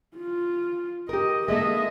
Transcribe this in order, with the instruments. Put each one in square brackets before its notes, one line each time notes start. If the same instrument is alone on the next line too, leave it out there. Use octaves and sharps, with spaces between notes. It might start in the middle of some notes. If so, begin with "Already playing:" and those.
[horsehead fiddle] F4
[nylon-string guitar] G4 A#4 [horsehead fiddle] D#5
[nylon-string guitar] G#3 A#3 A4 [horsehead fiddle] D#5 E5